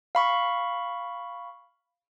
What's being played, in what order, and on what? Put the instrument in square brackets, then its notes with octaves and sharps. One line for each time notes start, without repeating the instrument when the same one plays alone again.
[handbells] F5 B5 C#6